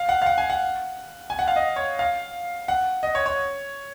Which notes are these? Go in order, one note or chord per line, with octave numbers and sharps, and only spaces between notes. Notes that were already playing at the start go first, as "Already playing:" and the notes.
Already playing: F5
F#5
F5
F#5
G#5
F#5
G#5
F#5
F5
D#5
C#5
F5
F#5
D#5
C#5
C#5